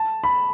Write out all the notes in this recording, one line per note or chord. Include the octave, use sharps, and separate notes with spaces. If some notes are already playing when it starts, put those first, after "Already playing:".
Already playing: A5
B5